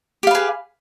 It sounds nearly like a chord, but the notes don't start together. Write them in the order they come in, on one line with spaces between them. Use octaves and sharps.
G4 F5 B4 G#4